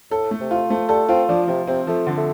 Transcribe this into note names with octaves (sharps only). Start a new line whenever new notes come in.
A2 A4
A3
C3
F4
F3 A3
G3 A4
C4 F4
F3 D4
C3 F3
C3 C4
F3 A3
D3
A3